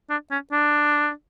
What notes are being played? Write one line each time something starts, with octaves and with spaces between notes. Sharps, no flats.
D4
C#4
D4